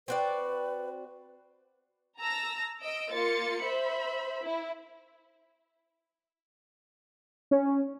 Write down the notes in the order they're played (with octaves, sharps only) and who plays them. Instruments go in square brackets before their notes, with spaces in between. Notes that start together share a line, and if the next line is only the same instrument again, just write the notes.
[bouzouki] C4 F#4 D5 [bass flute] B4
[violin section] A5 A#5 E6 A#6
D#5 E6 D7
A#3 F4 A6 C#7
C5 E5 B5
E4
[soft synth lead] C#4